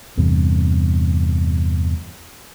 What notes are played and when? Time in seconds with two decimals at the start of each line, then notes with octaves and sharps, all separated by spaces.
0.17 E2 G2 C3